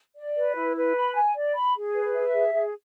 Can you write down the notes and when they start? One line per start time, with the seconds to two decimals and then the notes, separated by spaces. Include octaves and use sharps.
0.16 D5
0.36 B4
0.56 E4
0.76 B4
0.96 B5
1.15 G#5
1.36 D5
1.55 B5
1.75 G#4
1.95 B4
2.14 E5
2.35 G#4
2.54 G#4